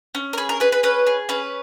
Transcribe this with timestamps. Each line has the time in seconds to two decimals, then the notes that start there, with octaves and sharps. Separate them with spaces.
0.15 C#4
0.33 A#4
0.38 G#4 B4
0.49 A#4
0.60 G#4 B4
0.72 B4
0.83 C#4 B4
1.07 G#4
1.29 C#4 B4